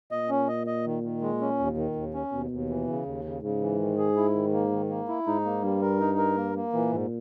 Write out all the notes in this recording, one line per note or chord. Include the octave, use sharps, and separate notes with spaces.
A#2 D#5
C#4
D#5
D#5
D#3
D#3
G#3
C#4
D#2
D#3
D#2
C#4
D#2 B2
D#2
E3
C#3
D#2
C#3
G#2 C#3
E3
D#3
G#4
E4
D#3
A#3
D#3
A#3
E4
G#2 D#4
A#3
G2 G3
A#4
D#4
A#4
A#3
A#3
A#2 E3
G#2